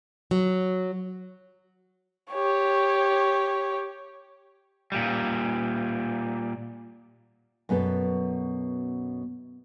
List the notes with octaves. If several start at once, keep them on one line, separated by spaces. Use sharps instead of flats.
F#3
G4 C#5
A#2 G3
F#2 B2 B3 A4